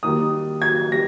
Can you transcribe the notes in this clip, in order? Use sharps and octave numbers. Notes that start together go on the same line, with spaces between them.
D#2 D#3 G3 D#6
G#6
G3 A#6